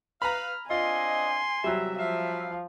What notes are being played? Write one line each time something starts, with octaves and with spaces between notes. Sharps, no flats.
B4 F5 A#5 B5 F6
C4 D4 F4 D#5 G#5 C6
E2 C3 F#3 G3 E5
F3 E5 F5